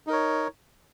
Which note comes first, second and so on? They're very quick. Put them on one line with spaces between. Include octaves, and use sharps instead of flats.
D#4 A#4 C#5